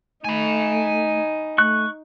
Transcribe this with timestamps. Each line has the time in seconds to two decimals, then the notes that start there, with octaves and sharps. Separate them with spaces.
0.24 A3 D#4 G#5 B5
1.58 A3 C#6 F#6